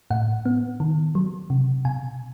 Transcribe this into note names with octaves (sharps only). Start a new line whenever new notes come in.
A2 F#5
B3
D#3
F#3
C3
B2 G#5